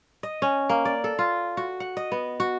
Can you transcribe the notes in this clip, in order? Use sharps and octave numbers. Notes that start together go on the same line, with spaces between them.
D#5
C#4
A#3
D5
A4
F4
F#4
F#5
D#5
B3
F#4